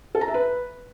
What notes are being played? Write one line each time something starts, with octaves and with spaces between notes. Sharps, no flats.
A4
A#5
E5
B4